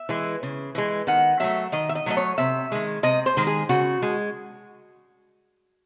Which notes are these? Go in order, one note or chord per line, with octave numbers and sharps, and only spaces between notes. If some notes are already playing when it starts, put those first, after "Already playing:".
Already playing: E5
E3 G#3
C#3
E3 G#3
D#3 F#5
F#3 A3 E5
D#3 D#5
E5
D#5
F#3 A3 D#5
C#5
C3 E5
D#3 G#3
C3 D#5
C5
D#3 G#3
G#4
C#3 F#4
G#3